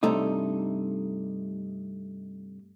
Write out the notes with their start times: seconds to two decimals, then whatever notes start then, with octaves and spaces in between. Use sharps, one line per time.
0.03 G2 C3 A3 D#4